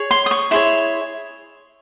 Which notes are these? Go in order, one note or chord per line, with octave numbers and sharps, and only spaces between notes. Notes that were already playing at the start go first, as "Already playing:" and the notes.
Already playing: G#4 C#5
C6
D#6
C#6
E4 G#4 C#5 C6